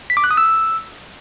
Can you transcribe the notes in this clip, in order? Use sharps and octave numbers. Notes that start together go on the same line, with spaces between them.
B6
D6
F#6
D#6
E6